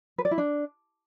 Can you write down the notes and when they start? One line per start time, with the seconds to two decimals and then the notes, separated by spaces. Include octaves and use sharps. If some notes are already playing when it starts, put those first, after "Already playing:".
0.18 B4
0.25 D5
0.31 E4
0.38 D4